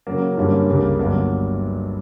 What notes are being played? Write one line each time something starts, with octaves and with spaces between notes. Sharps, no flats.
C#3 F#3 A#3
G2 D3 G3 A#3 C#4
C#2 C#3 G3 A#3
G1 G2 F#3 A#3